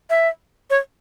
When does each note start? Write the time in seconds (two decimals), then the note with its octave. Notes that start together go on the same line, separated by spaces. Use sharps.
0.10 E5
0.70 C#5